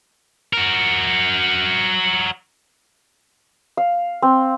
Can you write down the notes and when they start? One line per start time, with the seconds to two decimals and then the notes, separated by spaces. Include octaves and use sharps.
0.53 F#4 A#4
3.77 F5
4.22 C4